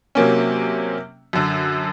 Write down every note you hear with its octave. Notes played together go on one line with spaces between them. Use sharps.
C3 F#3 A#3 C#4
F#2 D3